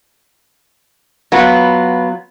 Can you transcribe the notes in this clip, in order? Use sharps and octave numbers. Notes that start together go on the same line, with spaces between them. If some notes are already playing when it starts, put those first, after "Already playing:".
F#3 B3 F4